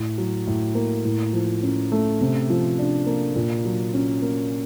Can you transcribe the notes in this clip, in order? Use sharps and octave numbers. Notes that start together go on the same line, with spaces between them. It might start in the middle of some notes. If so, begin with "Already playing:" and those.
Already playing: A2
F#3
A2
A#3
A2
F3
C#4
A3
C3
F3
D4
A#3
A#2
F#3
C#4
A#3